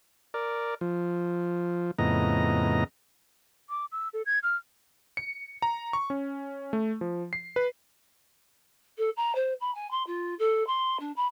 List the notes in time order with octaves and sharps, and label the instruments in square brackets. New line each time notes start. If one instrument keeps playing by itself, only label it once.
[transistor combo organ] A#4 D5
F3
F2 A2 C#3 B3 D#5 A#5
[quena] D6
E6
A4
G#6
F6
[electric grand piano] C#7
A#5
C#6
C#4
A3
F3
C7
B4
[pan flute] A4
A#5
C5
B5
G#5
C6
F4
A4
C6
D4
B5